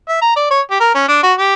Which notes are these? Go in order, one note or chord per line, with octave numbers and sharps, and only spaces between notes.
E5
A#5
D5
C#5
G4
A#4
C#4
D4
F#4
G4